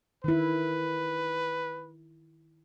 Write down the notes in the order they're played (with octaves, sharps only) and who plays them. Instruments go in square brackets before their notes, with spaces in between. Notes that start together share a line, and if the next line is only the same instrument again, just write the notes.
[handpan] D#3 E4 [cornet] B4